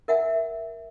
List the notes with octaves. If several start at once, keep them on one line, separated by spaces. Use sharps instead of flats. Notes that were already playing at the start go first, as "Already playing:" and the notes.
A#4 E5 F#5 G#5